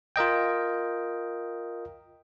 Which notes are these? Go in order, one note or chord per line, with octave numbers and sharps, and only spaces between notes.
F4 A#4 D#5 G5